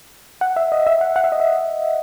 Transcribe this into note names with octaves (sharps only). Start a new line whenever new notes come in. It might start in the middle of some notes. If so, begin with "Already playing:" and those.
F#5
E5
D#5
E5
F#5
F#5
E5
D#5
E5